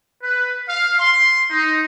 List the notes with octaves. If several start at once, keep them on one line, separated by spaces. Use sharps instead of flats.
B4
F5
C6
D#4